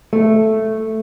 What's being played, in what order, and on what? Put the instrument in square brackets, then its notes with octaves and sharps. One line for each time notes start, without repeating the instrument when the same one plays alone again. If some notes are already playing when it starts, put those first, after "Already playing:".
[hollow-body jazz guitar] A3